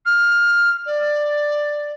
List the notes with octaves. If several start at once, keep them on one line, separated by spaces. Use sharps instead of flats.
F6
D5